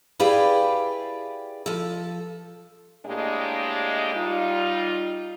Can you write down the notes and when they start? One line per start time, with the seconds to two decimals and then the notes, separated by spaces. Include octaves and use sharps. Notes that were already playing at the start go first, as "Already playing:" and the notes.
0.20 E4 G4 G#4 B4 D5 F5
1.66 F3 A4
3.06 A2 G#3 A#3 D4 G4 D#5
4.15 G3 D#4 F4